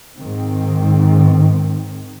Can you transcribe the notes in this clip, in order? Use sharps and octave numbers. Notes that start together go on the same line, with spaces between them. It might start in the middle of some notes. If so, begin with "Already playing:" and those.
G#2 D#3 C4